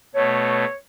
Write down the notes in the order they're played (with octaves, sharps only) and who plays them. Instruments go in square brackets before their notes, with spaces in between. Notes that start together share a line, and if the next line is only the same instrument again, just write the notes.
[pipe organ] B2 A3 [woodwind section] C#5